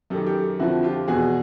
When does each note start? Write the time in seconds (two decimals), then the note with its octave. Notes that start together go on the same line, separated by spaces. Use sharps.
0.10 F#2 D#3 G4 A4
0.26 G4 A4
0.59 F2 D3 F3 E4 F#4
0.83 F4 G4
1.08 E2 B2 F#4 G#4